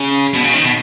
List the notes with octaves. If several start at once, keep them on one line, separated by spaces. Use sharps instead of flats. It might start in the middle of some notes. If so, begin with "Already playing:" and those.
Already playing: C#3
B2
C#3
D#3
B2